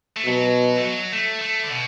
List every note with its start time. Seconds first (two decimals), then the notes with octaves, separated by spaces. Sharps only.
0.17 A3
0.26 B2 F#3
0.77 A3
0.85 F#3
1.12 A3
1.41 A3
1.63 D3
1.71 B2